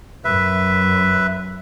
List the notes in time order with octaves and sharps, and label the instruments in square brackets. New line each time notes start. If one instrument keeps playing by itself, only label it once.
[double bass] F#2 [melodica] B4 E5